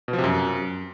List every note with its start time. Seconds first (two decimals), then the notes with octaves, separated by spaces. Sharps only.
0.08 B2
0.13 F3
0.18 C3
0.24 F#2